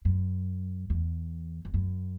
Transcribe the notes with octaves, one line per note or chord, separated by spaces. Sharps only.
F#2
E2
E2
F#2